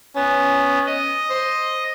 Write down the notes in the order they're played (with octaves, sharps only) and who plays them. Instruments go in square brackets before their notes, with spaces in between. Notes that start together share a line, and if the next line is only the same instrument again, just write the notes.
[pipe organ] B3 [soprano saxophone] C#4
[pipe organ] D#5
[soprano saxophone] C5